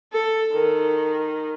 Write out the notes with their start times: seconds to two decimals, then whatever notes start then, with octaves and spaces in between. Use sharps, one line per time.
0.13 A4
0.53 D#3